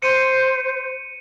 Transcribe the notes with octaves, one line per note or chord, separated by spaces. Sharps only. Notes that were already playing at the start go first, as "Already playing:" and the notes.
C5 C#7 D#7